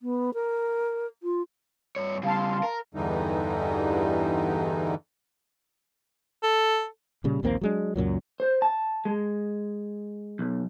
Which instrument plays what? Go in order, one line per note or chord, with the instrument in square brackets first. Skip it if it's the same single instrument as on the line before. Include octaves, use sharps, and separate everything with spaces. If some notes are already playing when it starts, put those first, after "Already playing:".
[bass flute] B3
A#4
F4
[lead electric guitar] G2 C#5
[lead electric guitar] C#3 G3 [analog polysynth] F5 A5 C6
[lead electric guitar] A#4
[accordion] E2 G2 D3 E3 G3 D#4
[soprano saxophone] A4
[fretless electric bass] A#2 C#3 G3
A#1 D#2 A#3 C4
F#3 G#3 D4
C#2 F#2 A#2 F#3
[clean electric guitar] C5
A5
G#3
B1